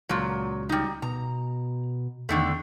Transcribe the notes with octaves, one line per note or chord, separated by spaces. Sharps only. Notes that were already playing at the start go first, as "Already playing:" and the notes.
C#2 A#2 F#3
G3 D#4
B2 A#5
E2 D3 D#3 A3